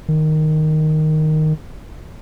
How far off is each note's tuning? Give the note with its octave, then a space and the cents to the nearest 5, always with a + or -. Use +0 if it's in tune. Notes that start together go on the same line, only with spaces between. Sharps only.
D#3 -5